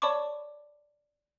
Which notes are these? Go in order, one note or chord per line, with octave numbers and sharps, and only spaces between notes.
C#5 D5 A5 B5 C#6 D6